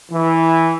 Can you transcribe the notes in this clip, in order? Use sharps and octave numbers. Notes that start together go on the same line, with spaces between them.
E3